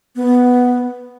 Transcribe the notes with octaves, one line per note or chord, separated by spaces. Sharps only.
B3